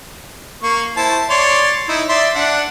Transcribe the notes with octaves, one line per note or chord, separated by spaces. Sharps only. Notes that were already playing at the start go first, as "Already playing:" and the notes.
A#3 C#6
E4 C5 A5
C#5 D5 C6
D#4 E4
D5 E5 C6
D4 F#5